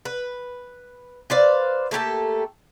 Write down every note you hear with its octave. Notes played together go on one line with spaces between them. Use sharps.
B4
B4 C5 D5 F5
A3 A#3 G4 A4